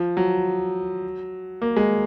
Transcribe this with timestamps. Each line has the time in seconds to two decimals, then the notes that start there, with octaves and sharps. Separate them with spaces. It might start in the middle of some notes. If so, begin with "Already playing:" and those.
Already playing: F3
0.17 F#3
1.62 A#3
1.77 G#3